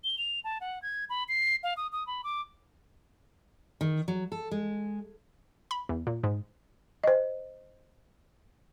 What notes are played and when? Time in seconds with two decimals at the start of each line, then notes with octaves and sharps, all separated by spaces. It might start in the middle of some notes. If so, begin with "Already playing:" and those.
0.04 G7
0.18 F7
0.44 A5
0.61 F#5
0.82 G#6
1.10 B5
1.28 C7
1.63 F5
1.77 D#6
1.93 D#6
2.07 B5
2.24 D6
3.81 D#3
4.08 F#3
4.32 A4
4.51 G#3
5.71 B5
5.89 E2
6.07 A#2
6.24 G#2
7.04 C5 D#5